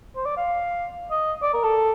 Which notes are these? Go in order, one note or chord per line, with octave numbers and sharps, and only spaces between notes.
C5
D5
F5
D#5
D5
A#4
A4